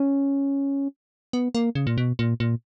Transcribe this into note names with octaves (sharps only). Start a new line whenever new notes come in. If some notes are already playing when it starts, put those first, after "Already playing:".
Already playing: C#4
B3
A#3
C#3
A#2
B2
A#2
A#2